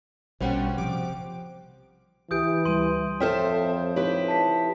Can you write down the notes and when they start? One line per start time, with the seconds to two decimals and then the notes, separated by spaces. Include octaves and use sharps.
0.41 A#1 B2 G3 C#4 C5 F#5 G5
0.78 C3 F3 D6
2.31 C#2 E3 G4 D#6 G6 D7
2.65 D2 G3 C6 D#7
3.20 F2 A4 C5 C#5 E5 G5 F6
3.96 D#4 E4 G4 B4 C#5
4.28 A5 B6